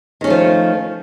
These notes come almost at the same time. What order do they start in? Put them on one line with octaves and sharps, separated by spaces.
D#3 C#4 A3 F3